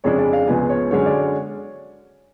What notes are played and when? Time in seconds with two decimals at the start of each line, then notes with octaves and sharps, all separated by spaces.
0.04 F2 C#3 G#3 D4 C#5
0.18 D5
0.33 F5
0.48 C#2 C#3 F3 B3 G#5
0.69 C#5
0.91 F#2 D3 G#3 C#4 C#5
1.06 D5
1.20 C#5